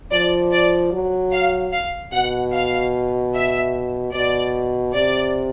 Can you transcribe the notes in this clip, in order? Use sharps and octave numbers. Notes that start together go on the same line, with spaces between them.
F3 D5
D5
F#3
F5
F5
B2 F#5
F5
E5
B2 D5
C3 D5